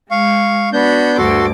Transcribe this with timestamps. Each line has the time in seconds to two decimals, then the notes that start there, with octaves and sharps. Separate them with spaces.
0.11 G#3 F5 C#6
0.73 B3 D4 F#4 B5 G6
1.18 D2 G2 F#4 A4 C6 D6